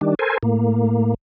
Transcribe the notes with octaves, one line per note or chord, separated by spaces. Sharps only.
D#3 G3 D4
A4 A#4 C5 G#5
A2 A#3